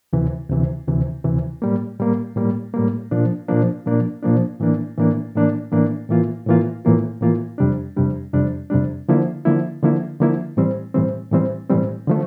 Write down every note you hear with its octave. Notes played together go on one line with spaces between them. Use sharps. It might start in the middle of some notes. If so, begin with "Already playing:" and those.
D2 C3 E3
D2 C3 E3
D2 C3 E3
D2 C3 E3
A2 G3 A#3
A2 G3 A#3
A2 G3 A#3
A2 G3 A#3
A#2 F3 A#3 D4
A#2 F3 A#3 D4
A#2 F3 A#3 D4
A#2 F3 A#3 D4
A2 E3 A#3 D4
A2 E3 A#3 D4
A2 E3 A#3 D4
A2 E3 A#3 D4
A2 E3 A#3 F4
A2 E3 A#3 F4
A2 E3 A#3 F4
A2 E3 A#3 F4
F2 C3 G3 D4
F2 C3 G3 D4
F2 C3 G3 D4
F2 C3 G3 D4
D3 F3 A#3 E4
D3 F3 A#3 E4
D3 F3 A#3 E4
D3 F3 A#3 E4
A2 E3 G3 C4
A2 E3 G3 C4
A2 E3 G3 C4
A2 E3 G3 C4
D3 F3 A3